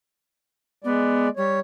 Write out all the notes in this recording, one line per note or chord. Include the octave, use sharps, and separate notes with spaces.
G#3 B3 D5
G3 C#5